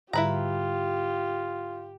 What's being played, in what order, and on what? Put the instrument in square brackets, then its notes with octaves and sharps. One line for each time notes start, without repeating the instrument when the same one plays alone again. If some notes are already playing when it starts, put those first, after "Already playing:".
[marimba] G#2 D3 G3 [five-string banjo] E4 B4 A#5 [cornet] F4 [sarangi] G4